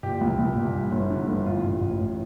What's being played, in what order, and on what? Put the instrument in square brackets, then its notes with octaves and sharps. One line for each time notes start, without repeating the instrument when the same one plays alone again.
[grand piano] A#2 G4
C2
C2
A#2
G2
G1
D3
G1
A2 F4
A1
A1
A2